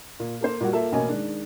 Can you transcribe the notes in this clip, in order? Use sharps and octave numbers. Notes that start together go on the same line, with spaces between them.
A#2
A#3 A4 C5
A#2 G3 A#3 F4 F#4
A#3 F4 A4 E5
A1 B2 A#3 C#4 D#5 G#5
D#3 G#3 D4